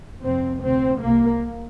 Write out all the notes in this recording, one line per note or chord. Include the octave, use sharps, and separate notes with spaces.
F2 C3 C4
D2 C3 C4
C2 C3 A#3